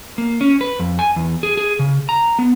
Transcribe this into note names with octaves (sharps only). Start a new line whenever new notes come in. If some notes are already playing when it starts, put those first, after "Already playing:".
A#3
C#4
B4
F2
G#5
E2
G#4
G#4
C#3
A#5
B3